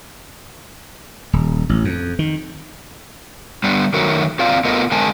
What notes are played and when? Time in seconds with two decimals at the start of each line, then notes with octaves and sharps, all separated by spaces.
1.33 D#1
1.69 A1
1.85 F2
2.19 D#3
3.64 G3 B3 D4
3.94 D#3 F#3 A3 D#4 F#4 A#4
4.39 C4 F4 D5 F5
4.65 A3 B3 F4 A#4 D#5
4.92 D3 G#3 A#4 D#5 G#5 A5